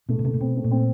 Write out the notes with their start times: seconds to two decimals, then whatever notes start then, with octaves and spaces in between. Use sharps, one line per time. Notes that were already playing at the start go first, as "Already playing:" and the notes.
0.09 B2 A3
0.19 B2
0.24 C3 A3
0.34 A#2
0.40 B2 C4
0.57 A3
0.64 A#2
0.71 C4